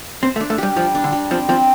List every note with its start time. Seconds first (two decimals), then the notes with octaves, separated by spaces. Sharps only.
0.23 C4 C5
0.36 A3
0.40 D4
0.50 A3
0.58 G3 G4
0.76 F3 G3
0.95 D4
1.04 D3
1.12 G3
1.31 F3 C4
1.49 F3 C4